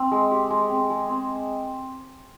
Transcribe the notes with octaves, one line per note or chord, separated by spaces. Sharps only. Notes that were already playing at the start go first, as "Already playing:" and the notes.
Already playing: C4
G#3
G4
G#3
C4
G#3
C4